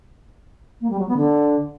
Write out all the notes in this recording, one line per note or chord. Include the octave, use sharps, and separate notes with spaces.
A#3
G3
F#3
B3
D3